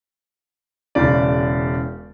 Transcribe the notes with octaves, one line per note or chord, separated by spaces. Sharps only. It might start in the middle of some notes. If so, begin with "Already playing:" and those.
E1 C#3 D5